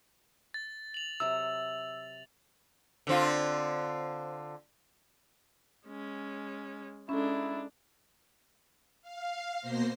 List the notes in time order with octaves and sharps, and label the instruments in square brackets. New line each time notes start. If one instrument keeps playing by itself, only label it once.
[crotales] A6
F7 F#7
[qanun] C3 F#3 A4 [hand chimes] E6
[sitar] D3 C4 F4
[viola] G#3 C#4
[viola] G#3 D4 [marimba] C#4 A4 [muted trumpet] E4
[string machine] F5
B2 A#3 C5 A#6 C7